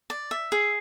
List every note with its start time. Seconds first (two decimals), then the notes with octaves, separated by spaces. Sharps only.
0.10 D5
0.31 E5
0.52 G#4